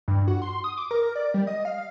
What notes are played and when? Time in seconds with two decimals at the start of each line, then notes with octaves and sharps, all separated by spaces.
0.08 G2
0.28 F#4
0.42 C6
0.64 D#6
0.77 D6
0.91 A#4
1.16 D5
1.34 G3
1.47 D#5
1.65 F5